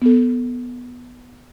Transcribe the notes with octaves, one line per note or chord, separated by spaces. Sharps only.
B3 A4